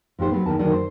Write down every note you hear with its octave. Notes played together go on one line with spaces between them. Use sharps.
G#2 F3 G4 C5
F#3 B3
E2 C3 D#3 A5
F#2 D3 D#3 F#3 D4
C5